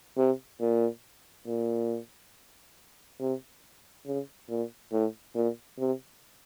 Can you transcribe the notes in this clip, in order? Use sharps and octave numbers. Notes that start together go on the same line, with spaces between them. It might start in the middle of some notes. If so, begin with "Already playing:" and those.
C3
A#2
A#2
C3
C#3
A#2
A2
A#2
C3